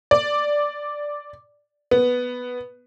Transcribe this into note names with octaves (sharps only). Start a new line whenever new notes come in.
D5
B3